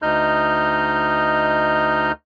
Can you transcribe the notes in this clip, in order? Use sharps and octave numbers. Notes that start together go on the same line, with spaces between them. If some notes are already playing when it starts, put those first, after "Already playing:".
D2 D#4 D#5 F6 G6